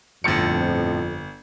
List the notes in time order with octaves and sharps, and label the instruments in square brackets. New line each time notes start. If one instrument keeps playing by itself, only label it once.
[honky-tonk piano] G1 C#7 [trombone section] F2 [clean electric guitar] A2 F3